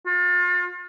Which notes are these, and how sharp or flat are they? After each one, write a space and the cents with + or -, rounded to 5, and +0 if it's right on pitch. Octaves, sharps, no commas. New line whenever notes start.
F4 +40